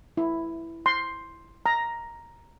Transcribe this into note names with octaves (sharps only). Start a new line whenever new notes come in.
E4
C6
A#5